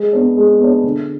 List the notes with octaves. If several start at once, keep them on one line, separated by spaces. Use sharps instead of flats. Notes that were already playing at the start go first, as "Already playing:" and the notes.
Already playing: G#3
B3 D4
G#3
B3 D4
D3